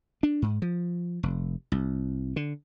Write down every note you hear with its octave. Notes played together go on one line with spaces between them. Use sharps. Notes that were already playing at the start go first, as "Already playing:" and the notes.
D4
G#2
F3
F1
C2
D3